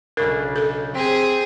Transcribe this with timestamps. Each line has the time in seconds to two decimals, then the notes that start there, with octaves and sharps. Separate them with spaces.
0.17 B1 C#3 D4 A#4
0.56 A4
0.95 C4 G4 G#4